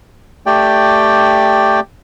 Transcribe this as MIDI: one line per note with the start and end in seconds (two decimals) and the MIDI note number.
0.46 1.80 57
0.46 1.80 67
0.46 1.80 74
0.46 1.80 79